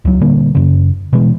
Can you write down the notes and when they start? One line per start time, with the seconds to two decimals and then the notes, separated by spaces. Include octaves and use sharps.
0.05 C#2 F#3
0.21 A#2 D3 G3 A#3
0.55 F#2 C#3
1.13 B2 E3 G#3